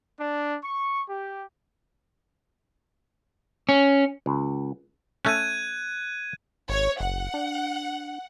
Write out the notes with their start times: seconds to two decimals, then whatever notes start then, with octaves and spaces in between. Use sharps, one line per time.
0.19 D4
0.64 C#6
1.08 G4
3.69 C#4
4.26 C#2
5.25 A3 C#4 F#6 G#6 D#7
6.69 G#1 C#5
7.00 F#1 F#5
7.34 D4